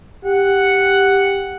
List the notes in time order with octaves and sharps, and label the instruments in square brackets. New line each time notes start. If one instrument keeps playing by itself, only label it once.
[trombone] G4 [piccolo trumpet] F#5